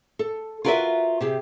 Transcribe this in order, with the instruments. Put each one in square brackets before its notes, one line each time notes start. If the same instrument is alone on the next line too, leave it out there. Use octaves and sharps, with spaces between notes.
[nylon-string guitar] A4
F4 F#4 A#4 B4 D#5 E5
C3 G4 G#4